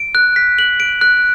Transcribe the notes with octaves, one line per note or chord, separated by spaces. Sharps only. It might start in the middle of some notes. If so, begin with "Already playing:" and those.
Already playing: D7
F#6
B6
F#7
D7
F#6